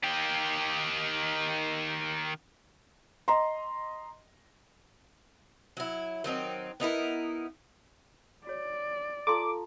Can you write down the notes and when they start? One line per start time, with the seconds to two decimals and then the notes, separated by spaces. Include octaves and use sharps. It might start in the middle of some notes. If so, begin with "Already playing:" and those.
0.04 D#3 G4
3.28 D#5 A#5 C6
5.77 F#3 E4
6.24 D#3 F#3 C4 D#4
6.80 B3 D#4 E4 A#4
8.47 F#4 C#5 D5
9.27 F4 A4 F5 A5 A#5 C6 D6